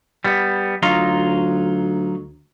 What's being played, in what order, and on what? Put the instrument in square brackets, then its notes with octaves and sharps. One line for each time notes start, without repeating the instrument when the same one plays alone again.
[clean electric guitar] G3 B3
[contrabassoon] D2 [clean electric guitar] F#3 D#4 F4